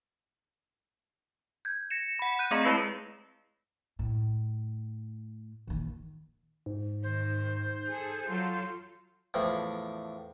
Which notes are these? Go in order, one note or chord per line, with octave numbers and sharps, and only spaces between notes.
G6 G#6
A#6 C#7 E7
F#5 B5
F#6 G6 D#7
A3 C4 G#4 D#5 A#5 C#7
G#3 E4 B4 B5 A#6 C7
A2
A#1 D#3
G#2
D#3 C5
G#4 A4
F#3 F4 A4 G6
E2 A2 F3